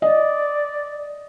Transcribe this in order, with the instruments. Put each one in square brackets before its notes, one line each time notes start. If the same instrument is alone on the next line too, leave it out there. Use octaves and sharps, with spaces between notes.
[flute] D5 [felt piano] D#5